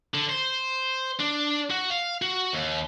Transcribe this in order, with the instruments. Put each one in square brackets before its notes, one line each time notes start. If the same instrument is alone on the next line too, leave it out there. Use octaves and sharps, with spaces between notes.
[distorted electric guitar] D3
C5
D4
F#4
F5
F#4
D#2